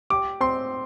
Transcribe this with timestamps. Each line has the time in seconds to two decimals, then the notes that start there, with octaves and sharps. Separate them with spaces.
0.10 G4 D6
0.40 C4 C6